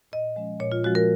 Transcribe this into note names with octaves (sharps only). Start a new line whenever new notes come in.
A#2 D#5
F3 G#3 C#4
A#2 C#5
F4
F3 G#3 C#4 F#4
A#4